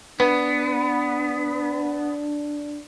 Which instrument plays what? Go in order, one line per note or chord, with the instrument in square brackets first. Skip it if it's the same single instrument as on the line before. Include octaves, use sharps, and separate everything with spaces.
[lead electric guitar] B3 [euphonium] D4 [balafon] B4